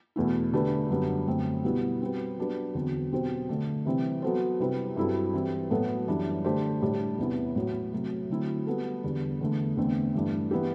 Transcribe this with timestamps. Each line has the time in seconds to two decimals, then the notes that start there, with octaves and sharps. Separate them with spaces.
0.16 E2 B2 A3 E4
0.53 D3 A3 D4 G4 B4
0.89 F#2 D3 G3 B3 D4
1.28 F#2 D3 A3 C4
1.64 B2 G3 B3 E4
2.01 G3 C4 F#4 B4
2.38 F#3 B3 D4 G4 B4
2.75 E2 D3 F#3 C4
3.12 B2 F#3 C4 G4 C5
3.49 D3 A3 D4
3.85 C3 E3 G3 C4
4.22 F#3 B3 F#4 A4 C5
4.60 C3 G3 C4 E4 B4
4.97 G2 F#3 C4 E4 A4
5.34 E3 G3 C4
5.71 A2 F#3 B3 F#4 A4
6.07 F#2 E3 G3 D4
6.44 D3 A3 D4 G4 C5
6.81 A2 G3 D4 G4
7.18 E2 C3 E3 B3 E4
7.56 A2 F#3 B3 F#4
7.93 C3 F#3 A3
8.30 D3 F#3 A3 C4 E4
8.66 G3 B3 F#4 A4
9.04 E2 D3 G3
9.41 E2 D3 A3
9.77 E2 D3 A3 C4
10.14 G2 E3 A3 D4
10.51 E3 B3 E4 G4